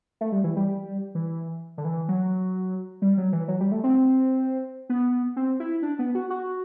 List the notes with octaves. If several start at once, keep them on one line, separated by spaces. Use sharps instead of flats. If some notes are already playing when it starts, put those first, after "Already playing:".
A3
G3
E3
G3
E3
D3
E3
F#3
G3
F#3
E3
F#3
G3
A3
C4
B3
C4
E4
D4
B3
F#4
F#4